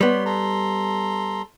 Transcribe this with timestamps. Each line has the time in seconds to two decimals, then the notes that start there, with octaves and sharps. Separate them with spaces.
0.01 G3 B3 C#5 C6
0.25 A4 A#5 C6